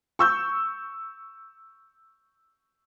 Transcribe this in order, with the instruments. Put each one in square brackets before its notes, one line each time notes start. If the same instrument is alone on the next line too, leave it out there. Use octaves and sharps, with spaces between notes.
[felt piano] C#6 E6 G6